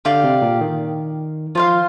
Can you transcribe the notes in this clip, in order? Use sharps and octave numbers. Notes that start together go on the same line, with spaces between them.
D3 G4 D5 F5
C3
A#2
D#3
F3 F4 C5 F5